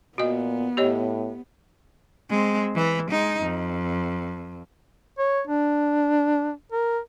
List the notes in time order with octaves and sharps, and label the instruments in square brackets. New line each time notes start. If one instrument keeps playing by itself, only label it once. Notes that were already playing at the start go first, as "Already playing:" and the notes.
[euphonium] A#2 [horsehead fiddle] B3 [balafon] F#4 D#5
[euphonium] A2 [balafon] G4 C#5 D#5
[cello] G#3 C4
E3
G#3 D#4
F2
[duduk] C#5
D4
A#4